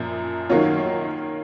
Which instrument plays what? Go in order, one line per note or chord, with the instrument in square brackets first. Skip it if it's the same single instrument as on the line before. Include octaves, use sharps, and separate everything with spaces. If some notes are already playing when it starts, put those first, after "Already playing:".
Already playing: [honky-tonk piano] F#2 [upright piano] A#2 F3
[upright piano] D#3 F#3 A#3 C#4 F4